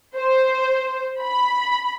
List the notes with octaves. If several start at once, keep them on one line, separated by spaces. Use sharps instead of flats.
C5
B5